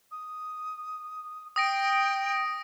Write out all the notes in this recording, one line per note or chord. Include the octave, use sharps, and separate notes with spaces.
D#6
G5 D#6 A#6 D7